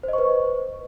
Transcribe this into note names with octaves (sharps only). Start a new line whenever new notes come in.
B4 C5 D#5 C#6